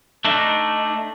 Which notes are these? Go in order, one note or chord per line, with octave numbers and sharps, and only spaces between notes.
A3 D4 D#4